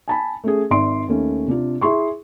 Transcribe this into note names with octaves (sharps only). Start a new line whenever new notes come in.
G#5 A5 B5
A3 C#4 G#4
G#1 D5 E5 C6 D7
D#2 A3 C#4
C3 D4 F4
E4 G#4 C6 C#6